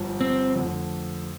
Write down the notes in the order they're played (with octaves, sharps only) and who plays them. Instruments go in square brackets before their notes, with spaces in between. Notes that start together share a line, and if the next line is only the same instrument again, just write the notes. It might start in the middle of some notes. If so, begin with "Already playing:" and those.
Already playing: [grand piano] G1 G2 F3
[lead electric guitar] C4
[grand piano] F2 D3 A3